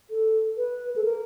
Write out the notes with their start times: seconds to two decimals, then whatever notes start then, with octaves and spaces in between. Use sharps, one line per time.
0.11 A4
0.58 B4
0.96 A4
1.04 A#4